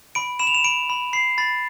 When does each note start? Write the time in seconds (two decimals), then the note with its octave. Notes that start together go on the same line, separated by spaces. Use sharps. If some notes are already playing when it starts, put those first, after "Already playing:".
0.15 B5 D7
0.39 B5 E7
0.47 F7
0.54 E7
0.64 B5 D7
0.90 B5
1.13 B5 C7
1.38 B5 A6